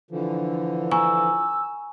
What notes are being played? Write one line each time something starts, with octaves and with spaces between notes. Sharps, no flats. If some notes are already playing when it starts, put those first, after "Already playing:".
D3 E3 F3
G#5 A#5 C#6 E6